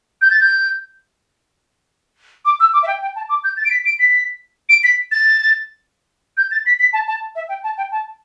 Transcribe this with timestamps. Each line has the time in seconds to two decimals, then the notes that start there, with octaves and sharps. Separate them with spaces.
0.22 G6
0.31 A6
0.41 G6
2.45 D6
2.60 E6
2.73 D6
2.83 E5
2.87 G5
3.02 G5
3.16 A5
3.29 D6
3.44 G6
3.57 A6
3.65 D7
3.71 B6
3.85 D7
3.99 B6
4.69 D7
4.84 B6
5.12 A6
6.37 G6
6.51 A6
6.66 B6
6.79 B6
6.93 A5
7.07 A5
7.35 E5
7.49 G5
7.64 A5
7.77 G5
7.92 A5